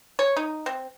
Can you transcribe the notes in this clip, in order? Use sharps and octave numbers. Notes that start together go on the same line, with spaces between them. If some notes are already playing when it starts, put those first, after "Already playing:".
C#5
D#4
C4